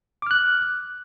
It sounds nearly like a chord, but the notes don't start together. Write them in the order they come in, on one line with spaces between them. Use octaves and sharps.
D6 F6 F#6